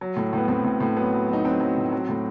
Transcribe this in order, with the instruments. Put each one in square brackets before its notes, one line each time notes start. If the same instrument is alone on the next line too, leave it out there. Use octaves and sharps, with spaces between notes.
[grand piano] F#3
A2
A2 B3
A2 C4
A2
A2
F#3 B3
F#3
F#3 D#4
F#3 C4
F#3
A2
F#3
A2